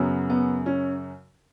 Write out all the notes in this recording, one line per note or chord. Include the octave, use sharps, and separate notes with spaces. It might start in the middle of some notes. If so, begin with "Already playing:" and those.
Already playing: F#2 C#3 F#3 B3
B3
C#4